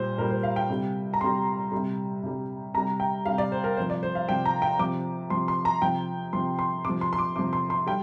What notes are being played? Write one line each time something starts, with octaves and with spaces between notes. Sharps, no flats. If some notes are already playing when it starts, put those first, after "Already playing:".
Already playing: A#2 G3 C5
A#2 G3 A#4
C5
F5
G5
C3 G3
A#5
C3 G3 C6
C3 G3
C3 G3
C3 G3 A#5
G5
C3 G3 F5
D5
C5
A#4
C3 F3 C5
D5
C5
F5
C3 F3 G5
A#5
G5
C3 F3 D6
C3 F3 C6
C6
A#5
C3 F3 G5
C3 F3 C6
C6
C3 D6
F3
C6
C6
D6
C3 F3 D6
C6
C6
G3 G5